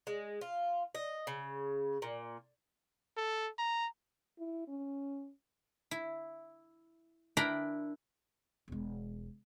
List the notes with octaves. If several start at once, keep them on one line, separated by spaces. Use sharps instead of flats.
G#3
F4
D#5
C#3
A#2
A4
A#5
E4
C#4
E4
D4 E4 A#4 G5 A#5 B5
E1 G#3